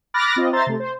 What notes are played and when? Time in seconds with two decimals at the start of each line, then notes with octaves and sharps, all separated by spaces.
0.14 B5 D6 F6 F#6 A6 A#6
0.36 C4 F4 D#5
0.52 C5 E5 A#5 C6 A6
0.66 C3 A3
0.80 C5